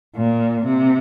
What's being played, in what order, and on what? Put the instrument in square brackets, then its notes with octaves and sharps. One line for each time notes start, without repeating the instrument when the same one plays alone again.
[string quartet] A#2
C3